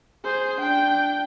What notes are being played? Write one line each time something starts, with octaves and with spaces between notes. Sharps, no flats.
G#4 C5
D4 G5